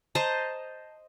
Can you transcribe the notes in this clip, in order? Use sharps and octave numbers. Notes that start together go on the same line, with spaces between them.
C5 D#5 A5 A#5